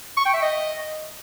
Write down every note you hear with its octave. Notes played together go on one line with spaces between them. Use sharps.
C#6
G5
E5
D#5